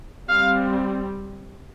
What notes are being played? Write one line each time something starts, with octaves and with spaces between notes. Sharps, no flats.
G3 C4 F5